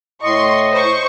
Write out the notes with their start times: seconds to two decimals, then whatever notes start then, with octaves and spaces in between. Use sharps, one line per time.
0.23 A2 D#5 C6 C#6
0.73 C5 C#6